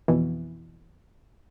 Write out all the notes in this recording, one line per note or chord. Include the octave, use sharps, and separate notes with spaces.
F2 B2 E3